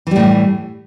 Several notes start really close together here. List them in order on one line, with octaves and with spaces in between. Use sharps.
E3 G3 A2